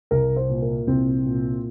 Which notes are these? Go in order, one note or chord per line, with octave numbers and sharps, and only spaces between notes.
C2 A#4
C5
A#2
A#4
C2 C4
A#2